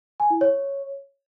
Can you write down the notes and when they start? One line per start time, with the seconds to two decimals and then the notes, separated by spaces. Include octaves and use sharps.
0.20 G#5
0.30 E4
0.41 C#5